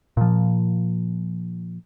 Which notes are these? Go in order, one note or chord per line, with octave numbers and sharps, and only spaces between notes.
A#2 F3